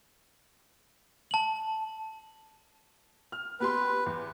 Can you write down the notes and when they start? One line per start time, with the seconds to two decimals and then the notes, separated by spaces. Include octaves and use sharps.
1.31 A5 F#7
3.32 F6
3.60 B3 G4 B4 C6
4.06 E2